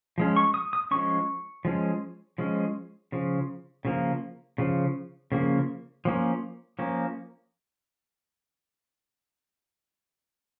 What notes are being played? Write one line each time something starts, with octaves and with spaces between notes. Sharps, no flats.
F3 G#3 C#4
C#6
D#6
D#6
F3 G#3 C#4 C#6
F3 G#3 C#4
F3 G#3 C#4
C#3 F3
C#3 F3 A#3
C#3 F3
C#3 F3 A#3
F3 A#3 C#4
F3 A#3 C#4